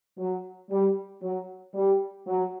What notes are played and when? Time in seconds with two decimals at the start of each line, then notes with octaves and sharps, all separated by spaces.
0.18 F#3
0.70 G3
1.22 F#3
1.75 G3
2.27 F#3